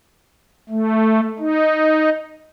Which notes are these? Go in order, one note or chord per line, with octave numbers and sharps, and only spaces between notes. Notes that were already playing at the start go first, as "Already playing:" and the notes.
A3
D#4